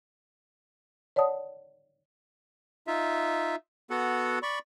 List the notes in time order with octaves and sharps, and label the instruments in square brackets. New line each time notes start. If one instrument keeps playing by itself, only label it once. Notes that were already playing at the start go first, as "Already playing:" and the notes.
[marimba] C#5 D5 F#5 A5 D#6
[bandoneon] D#4 F4 E5
B3 F#4 A4 F#5
D5 B5 C#6